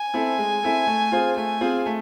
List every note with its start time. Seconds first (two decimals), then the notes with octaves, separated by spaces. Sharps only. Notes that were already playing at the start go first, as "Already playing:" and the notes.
Already playing: G#5
0.14 C4 E4 A4
0.38 G#3
0.63 C4 E4 A4
0.87 A3
1.12 C4 F4 G#4 C5
1.36 A3 G#5
1.61 C4 F4 G#4 C5
1.86 A3